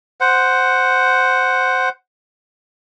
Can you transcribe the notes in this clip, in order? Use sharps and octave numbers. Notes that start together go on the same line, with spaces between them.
C5 F#5